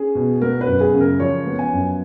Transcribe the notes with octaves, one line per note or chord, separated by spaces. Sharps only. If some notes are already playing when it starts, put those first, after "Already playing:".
Already playing: C#4 G#4
B2
B3 A#4
B4
F#2
G#4
C#3
A#4
F3 C#5
B3
G#5
F#2